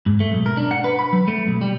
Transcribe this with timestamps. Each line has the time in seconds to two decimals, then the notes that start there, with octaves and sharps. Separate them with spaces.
0.06 G#2
0.20 A3
0.32 B1
0.46 A#4
0.57 D4
0.71 F#5
0.84 B4
0.99 B5
1.13 F#3
1.28 A3
1.47 B1
1.61 G3